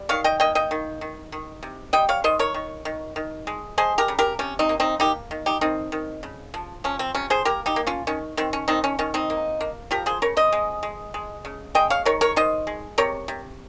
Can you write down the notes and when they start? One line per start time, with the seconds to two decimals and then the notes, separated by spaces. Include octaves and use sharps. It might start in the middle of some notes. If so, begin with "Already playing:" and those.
Already playing: G3
0.09 D#3 C#5 F5
0.24 D#5 G5
0.40 A#3 D#5 G5
0.55 D#5 G5
0.71 D#3
1.01 D#3
1.32 D#3
1.63 C3
1.93 G3 D#5 G5
2.09 C#5 F5
2.24 D#3 C5 D#5
2.39 A#4 C#5
2.54 D#3
2.85 D#3
3.16 D#3
3.47 G#3
3.78 G#3 G#4 C5
3.98 G4 A#4
4.08 C#3
4.19 G4 A#4
4.39 C3 C#4
4.59 C4 D#4
4.69 A#3
4.80 C4 D#4
5.00 A#3 D#4 G4
5.31 D#3
5.46 D#4 G4
5.61 D#3 C4 D#4
5.92 D#3
6.23 C#3
6.54 F3
6.84 F3 C#4
6.99 C4
7.15 C3 C#4
7.30 G#4 C5
7.45 A#3 G4 A#4
7.66 D#4 G4
7.76 A#3
7.87 C#4 F4
8.07 D#3 C#4
8.37 D#3 C4
8.53 C#4
8.68 D#3 C4 D#4
8.84 C#4
8.99 D#3 C#4
9.14 C4 D#4
9.30 A#3
9.61 A#3
9.91 F3 G4 A#4
10.06 G#4 C5
10.22 C#3 A#4 C#5
10.37 C5 D#5
10.52 G#3
10.83 G#3
11.14 G#3
11.45 C#3
11.75 G#3 D#5 G5
11.90 C#5 F5
12.05 D#3 A#4 C#5
12.21 A#4 C#5
12.36 D#3 C5 D#5
12.67 G#3
12.98 C3 A#4 C#5
13.28 C3